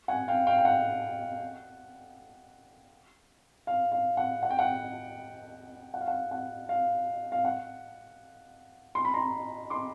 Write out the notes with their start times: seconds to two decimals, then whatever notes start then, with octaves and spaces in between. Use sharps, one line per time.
0.08 F#5 G#5
0.28 F5 G5
0.47 F5 G5
0.58 G5
0.65 F#5
3.67 F5
3.92 F5
4.17 F#5
4.43 F#5
4.50 G5
4.59 F#5
5.94 F#5
6.01 F5
6.08 F#5
6.31 F#5
6.69 F5
7.32 F5
7.45 F#5
8.95 C6
9.05 B5
9.14 A#5 C6
9.70 C6 D6